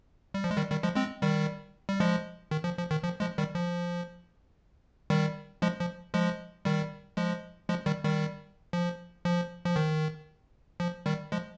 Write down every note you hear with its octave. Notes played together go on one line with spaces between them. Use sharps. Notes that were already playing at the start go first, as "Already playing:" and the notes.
G3
F3
G#3
D#3 G3
D#3 G3
F3 G#3
G#3 C4
D#3 G3
G3
F3 G#3
D#3
F3
F3
D#3
F3
F3 G#3
D#3 G3
F3
D#3 G3
F3 G#3
F3
F3 G#3
D#3 G3
F3 G#3
F3 G#3
D#3 G3
D#3 G3
F3
F3
F3
D#3
F3
D#3 G3
F3 G#3